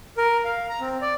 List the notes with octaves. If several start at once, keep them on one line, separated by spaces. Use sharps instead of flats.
A#4
F5
A#5
C4
D5